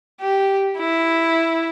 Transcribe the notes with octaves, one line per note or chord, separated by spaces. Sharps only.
G4
E4